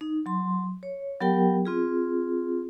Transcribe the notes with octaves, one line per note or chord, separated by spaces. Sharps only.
D#4
F#3 C6
C#5
F#3 B3 G4 A#4 G5
C4 F4 G#4